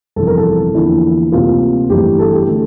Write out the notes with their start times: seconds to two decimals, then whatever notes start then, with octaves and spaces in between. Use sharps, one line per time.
0.16 G1 F2 C3 E3 A4
0.27 A#4
0.37 A4
0.74 E2 D3 F3 A#3 E4
1.32 D2 C3 G3 A#3 F4
1.90 G1 G2 E3 A3 G4
2.19 A4
2.33 G4
2.47 D3 A3 A4